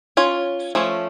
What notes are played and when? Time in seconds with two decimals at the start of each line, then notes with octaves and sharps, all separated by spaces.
0.17 C#4 F4 C#5
0.75 F3 A3 C#4